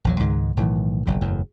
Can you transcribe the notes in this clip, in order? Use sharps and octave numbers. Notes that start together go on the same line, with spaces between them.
A#1 E2 F#3
C#2 G#2 D#3 G#3
B1 A2 D#3 E3
F#1 B1 F2
F#1 E2 A2